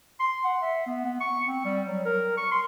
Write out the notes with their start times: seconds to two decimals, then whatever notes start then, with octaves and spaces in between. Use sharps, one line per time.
0.20 C6
0.44 F#5
0.62 E5
0.87 B3
1.05 B3
1.20 C#6
1.46 C4
1.65 G3
1.86 F#3
2.05 A#4
2.37 C#6
2.52 C6